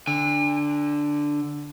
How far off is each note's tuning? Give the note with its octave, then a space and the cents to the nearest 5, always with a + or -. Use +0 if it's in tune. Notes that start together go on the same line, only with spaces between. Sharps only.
D3 +0 G#5 -45